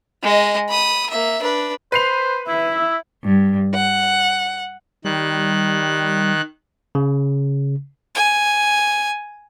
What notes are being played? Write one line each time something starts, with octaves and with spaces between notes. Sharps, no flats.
G#3 D#5
B5 D#6
A#3 E5
D4 B4
B4 C5 C7 F7
E4 E5
G2
F#5
D#3 G3 F#6
C#3
G#5